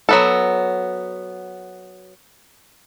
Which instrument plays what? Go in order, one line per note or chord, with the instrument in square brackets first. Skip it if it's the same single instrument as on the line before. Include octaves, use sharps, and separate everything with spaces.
[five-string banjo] F#3 B3 A4